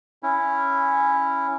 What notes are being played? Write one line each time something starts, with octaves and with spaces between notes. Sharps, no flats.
C#4 E4